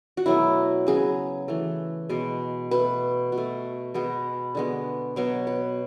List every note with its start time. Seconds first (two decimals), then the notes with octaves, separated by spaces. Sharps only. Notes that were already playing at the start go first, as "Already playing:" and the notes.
0.17 F#4
0.26 B2 F#3 A3 E4
0.87 C#3 F#3 B3 G#4
1.48 E3 A3
2.09 B2 G#3 B3
2.71 B2 A3 B4
3.32 B2
3.38 A3
3.94 B2 G#3 B3
4.55 D3 G#3 B3
5.16 B2 F#3 B3 C#5
5.47 B4